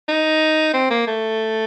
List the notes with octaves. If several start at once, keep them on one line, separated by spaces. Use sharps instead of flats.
D#4
C4
A#3
A3